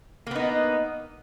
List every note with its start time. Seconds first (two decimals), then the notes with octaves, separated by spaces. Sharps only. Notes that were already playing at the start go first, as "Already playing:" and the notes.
0.27 A#3
0.31 B3
0.35 D#4